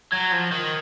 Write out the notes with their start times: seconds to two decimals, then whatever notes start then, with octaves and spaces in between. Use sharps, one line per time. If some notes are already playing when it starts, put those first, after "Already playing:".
0.12 F#3 G#6
0.32 F3
0.52 D#3